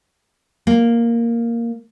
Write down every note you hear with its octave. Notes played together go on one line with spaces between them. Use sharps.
A#3